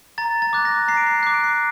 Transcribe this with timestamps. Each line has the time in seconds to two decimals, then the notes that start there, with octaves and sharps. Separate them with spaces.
0.18 A#5 A6
0.42 A6
0.53 D6 F#6
0.65 A#6
0.88 A#5 C7
0.97 D7
1.07 C7
1.23 D6 F#6 C7
1.34 D7
1.44 C7